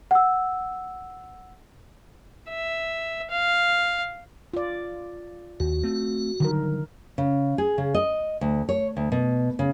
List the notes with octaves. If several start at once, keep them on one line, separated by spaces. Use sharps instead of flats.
F#5 E6
E5
F5
F4 D5
D#2 F#4
A3 C4
D3 D#3 F#3 G3 A#4
C#3
G#4
C#3
D#5
D2
C#5
D2
B2
C#3